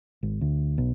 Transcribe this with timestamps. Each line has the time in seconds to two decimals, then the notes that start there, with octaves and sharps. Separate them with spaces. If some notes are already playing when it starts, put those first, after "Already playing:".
0.23 G#1
0.41 D2
0.78 B1